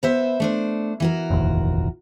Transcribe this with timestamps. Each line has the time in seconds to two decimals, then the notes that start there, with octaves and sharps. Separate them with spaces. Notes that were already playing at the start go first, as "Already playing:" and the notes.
0.03 B3 C5 E5
0.40 A3 D4 C5
1.00 E3 F#4 A#4
1.30 F1 A#1 D#2